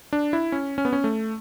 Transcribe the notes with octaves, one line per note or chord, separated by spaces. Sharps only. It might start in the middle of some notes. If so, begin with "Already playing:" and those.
D4
E4
C#4
C#4
B3
C#4
A3